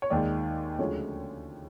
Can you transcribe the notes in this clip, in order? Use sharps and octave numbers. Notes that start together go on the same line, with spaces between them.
C#5
D#2 D#3 G#3 D5
D2 C#3 F3 G#3 C#5